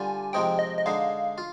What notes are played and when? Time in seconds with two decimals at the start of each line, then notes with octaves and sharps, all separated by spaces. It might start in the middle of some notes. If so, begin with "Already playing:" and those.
Already playing: D3 G3 D4 F4 G#5
0.33 C3 F3 G#3 C4 D#4 G5
0.59 D#5
0.78 D#5
0.86 D3 G#3 D#4 F5
1.38 F4